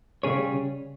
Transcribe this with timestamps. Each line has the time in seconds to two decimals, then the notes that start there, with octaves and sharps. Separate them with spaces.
0.23 C#3 G3 C#4 G#4 C#5